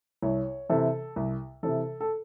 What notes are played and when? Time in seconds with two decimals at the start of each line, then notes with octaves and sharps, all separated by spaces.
0.23 C2 C#5
0.69 C3 E3 A4
1.16 C2
1.63 C3 E3 A4
2.00 A4